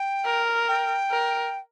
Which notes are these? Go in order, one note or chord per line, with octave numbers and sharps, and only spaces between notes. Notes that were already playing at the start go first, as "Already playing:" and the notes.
Already playing: G5
A#4
G5
A#4